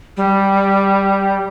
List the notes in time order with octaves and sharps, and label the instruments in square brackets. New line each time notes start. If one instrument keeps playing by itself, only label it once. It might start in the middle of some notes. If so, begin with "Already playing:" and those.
[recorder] G3